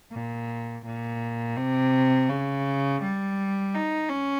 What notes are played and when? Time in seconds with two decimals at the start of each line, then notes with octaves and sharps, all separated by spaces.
0.12 A#2
0.85 A#2
1.57 C3
2.29 C#3
3.02 G3
3.75 D#4
4.10 C#4